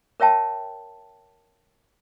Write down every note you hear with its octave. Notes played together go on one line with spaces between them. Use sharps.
A#4 C#5 E5 G5 A5